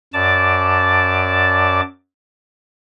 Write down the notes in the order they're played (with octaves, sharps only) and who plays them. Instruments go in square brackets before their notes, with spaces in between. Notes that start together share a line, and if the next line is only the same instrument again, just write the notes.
[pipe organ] F#2 D5 A5 D6